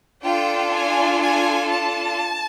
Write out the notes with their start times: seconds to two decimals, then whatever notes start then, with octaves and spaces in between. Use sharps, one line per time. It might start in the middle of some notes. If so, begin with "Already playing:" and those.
0.23 D4 F4 A4 G5
0.73 G#5
1.22 G#5
1.70 A5